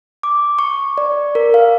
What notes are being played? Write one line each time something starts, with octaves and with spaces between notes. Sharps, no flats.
D6
C#6
D5
A#4
F5